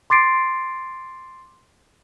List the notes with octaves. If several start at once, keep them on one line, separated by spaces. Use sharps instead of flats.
C6 D6 A6 C7 D7